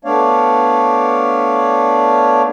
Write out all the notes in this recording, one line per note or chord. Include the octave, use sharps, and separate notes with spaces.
A3 B3 D4 C#5 D5 F5